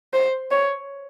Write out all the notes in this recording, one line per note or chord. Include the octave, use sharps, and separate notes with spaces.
C5
C#5